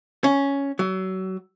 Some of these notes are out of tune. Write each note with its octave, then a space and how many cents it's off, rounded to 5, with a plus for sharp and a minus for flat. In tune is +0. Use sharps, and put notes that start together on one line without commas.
C#4 +5
F#3 +30